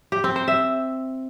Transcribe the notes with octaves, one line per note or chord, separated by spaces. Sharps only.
G4
C4
C5
E5